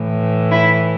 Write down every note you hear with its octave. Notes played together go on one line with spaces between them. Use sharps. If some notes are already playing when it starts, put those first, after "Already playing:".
Already playing: A2 E3
E4